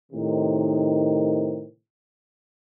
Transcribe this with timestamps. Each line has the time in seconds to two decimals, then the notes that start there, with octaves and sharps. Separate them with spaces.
0.12 A2 C3 D#3